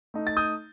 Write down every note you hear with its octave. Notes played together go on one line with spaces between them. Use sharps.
A3 D#4
A6
D#6 G6